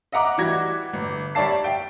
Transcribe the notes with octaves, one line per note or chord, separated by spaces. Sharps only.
D#5 E5 F#5 A#5 D6
E3 G3 F#4 G#6 A#6
G1
G3 C#5 D5 E5 A5 C7
E5 G5